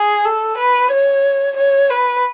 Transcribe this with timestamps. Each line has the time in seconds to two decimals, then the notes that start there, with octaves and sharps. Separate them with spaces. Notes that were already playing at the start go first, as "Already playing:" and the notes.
Already playing: G#4
0.25 A4
0.57 B4
0.91 C#5
1.57 C#5
1.90 B4